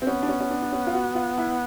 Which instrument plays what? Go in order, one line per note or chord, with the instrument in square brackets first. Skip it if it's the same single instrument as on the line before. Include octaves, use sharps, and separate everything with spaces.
[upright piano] C4
[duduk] B3 [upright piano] C#4
[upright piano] D4
C#4
C#4
D4
D4
C#4
F4
F#4
F4
E4